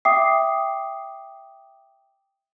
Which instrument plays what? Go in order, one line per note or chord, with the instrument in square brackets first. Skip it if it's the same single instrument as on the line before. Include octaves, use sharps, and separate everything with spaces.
[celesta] E5 G5 D6 D#6 C7